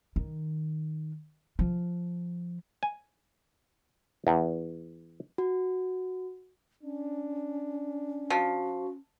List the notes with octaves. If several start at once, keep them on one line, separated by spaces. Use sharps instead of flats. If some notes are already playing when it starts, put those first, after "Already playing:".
D#3
F3
G#5
E2
F#4
C#4 D4
F3 F#4